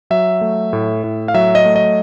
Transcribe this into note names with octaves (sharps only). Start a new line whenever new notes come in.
F#3 E5
A3
A2
A2
F5
F#3 E5
D#5
A3
D#5